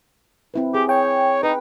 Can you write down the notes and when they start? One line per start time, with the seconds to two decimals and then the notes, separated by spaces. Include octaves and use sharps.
0.54 C4 E4 B4
0.74 G4 G#4
0.89 C#5 G5
1.43 D#4 B4